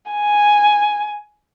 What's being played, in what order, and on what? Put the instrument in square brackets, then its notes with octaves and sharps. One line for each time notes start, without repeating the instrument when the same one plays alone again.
[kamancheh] G#5